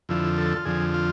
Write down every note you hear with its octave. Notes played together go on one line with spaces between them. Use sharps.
F2 D3 F3 E4
A4
F4
F2 D3 F3 G#4
F4